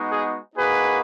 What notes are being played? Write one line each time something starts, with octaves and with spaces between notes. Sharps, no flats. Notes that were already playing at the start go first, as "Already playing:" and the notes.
Already playing: G#3 B3 D#4 F#4
G#4
A#3 D#4 F#4 G#4 B4